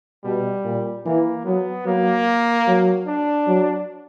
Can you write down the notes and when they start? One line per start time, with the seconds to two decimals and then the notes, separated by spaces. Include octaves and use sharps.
0.24 B2 G3
0.64 A#2
1.05 E3 A#3
1.45 F#3 B3
1.86 F#3 A#3
2.67 F#3
3.07 D4
3.47 F#3